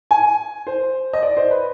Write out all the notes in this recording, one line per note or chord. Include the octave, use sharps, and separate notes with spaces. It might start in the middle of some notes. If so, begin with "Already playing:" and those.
G#5
C5
D#5
D5
C5
B4